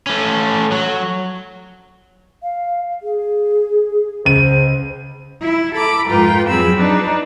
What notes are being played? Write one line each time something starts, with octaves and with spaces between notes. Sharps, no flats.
A3 C#4
F#3
F5
G#4
C#2 C5 D#7
E4
A4 A#5 B5 D6
F2 G#2 F4 A#4 B4 G5
F2 F#3 C4 G#4 B5 E6
D4 D#4 B4